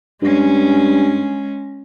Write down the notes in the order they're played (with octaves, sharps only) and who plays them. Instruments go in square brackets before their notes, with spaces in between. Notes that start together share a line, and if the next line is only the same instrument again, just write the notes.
[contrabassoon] G2 [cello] G#3 C#4